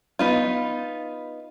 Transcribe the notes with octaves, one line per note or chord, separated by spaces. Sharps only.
B3 D#4 F4